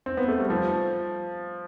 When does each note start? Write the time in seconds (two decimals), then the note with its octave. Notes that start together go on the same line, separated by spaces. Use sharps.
0.06 C4
0.17 B3
0.28 A3
0.39 G3
0.50 F3